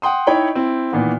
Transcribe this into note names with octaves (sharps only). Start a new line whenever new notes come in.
F#5 G5 C6 D#6
D#4 E4 C#5 G5 B5 C#6
C4 E4
A#2 D#3 E3 B3